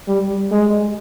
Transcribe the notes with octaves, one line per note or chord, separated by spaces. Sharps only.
G3
G#3